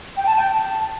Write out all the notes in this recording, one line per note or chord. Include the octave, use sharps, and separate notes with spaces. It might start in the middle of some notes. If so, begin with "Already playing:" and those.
G5
A5
G5
A5